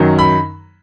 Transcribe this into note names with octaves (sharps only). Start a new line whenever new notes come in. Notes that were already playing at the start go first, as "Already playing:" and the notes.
Already playing: F#2 D#3 F#3
B5